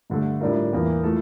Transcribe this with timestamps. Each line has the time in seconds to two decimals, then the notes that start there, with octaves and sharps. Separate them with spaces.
0.10 G2 D3 A3
0.41 A2 G3 D4 F4 A#4
0.73 E2 E3 A#3
1.03 F3 A3 E4 A4